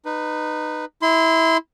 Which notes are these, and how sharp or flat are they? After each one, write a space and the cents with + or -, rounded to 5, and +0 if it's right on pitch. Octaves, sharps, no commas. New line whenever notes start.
D#4 -20 B4 +0
E4 -20 C6 -30